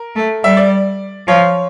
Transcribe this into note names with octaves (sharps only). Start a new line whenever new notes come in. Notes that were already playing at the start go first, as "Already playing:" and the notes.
Already playing: A#4
A3
G3 E5
D5
F3 C#5